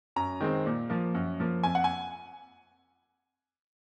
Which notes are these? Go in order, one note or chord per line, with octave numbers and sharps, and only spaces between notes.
F#2 A#5
D#3 G#3 C4
A#2
F3 A#3
F#2
F3 A#3
F2 G#5
F#5
G#5